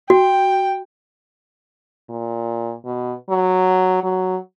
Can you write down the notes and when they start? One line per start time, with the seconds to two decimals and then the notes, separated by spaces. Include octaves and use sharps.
0.10 F#4 G5
2.09 A#2
2.85 B2
3.30 F#3
4.03 F#3